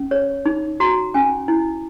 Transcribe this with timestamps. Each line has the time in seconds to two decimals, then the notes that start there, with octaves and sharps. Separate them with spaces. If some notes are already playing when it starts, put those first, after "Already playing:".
Already playing: C#4
0.11 C#5
0.46 D#4
0.80 F#4 A#5
1.14 C#4 G#5
1.48 E4